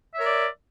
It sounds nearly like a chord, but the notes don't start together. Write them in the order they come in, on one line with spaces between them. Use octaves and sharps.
E5 C#5 A#4 D5